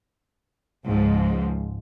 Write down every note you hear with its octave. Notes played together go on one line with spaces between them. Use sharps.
C#2 G#2 F3